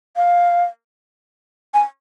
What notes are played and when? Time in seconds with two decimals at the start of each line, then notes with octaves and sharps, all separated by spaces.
0.16 F5
1.74 G#5